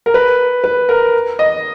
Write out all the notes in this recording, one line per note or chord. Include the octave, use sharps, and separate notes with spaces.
A#4
B4
B4
A#4
D#5